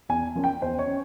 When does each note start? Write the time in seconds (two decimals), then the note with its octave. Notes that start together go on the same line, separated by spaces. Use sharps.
0.09 E2 G#5
0.35 C#3 F3 A#3 C#4
0.44 G5
0.62 E2 C5
0.79 C#5
0.87 C#4